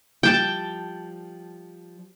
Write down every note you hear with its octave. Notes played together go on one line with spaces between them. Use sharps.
F3 G3 G5 A5